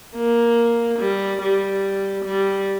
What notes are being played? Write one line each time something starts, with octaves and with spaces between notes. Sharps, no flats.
A#3
G3
G3
G3